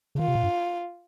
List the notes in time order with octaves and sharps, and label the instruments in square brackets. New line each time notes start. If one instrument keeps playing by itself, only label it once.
[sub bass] C#3
[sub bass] D#3 [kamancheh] F4
[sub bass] C3
A#2
G2